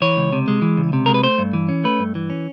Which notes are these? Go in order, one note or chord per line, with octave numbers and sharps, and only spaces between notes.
E3 C#5
C#2
C3
G#3
E3
C#2
C3
G#3 A#4
B4
A3 C5
G2
E3
C#4
A3 B4
G2
E3
C#4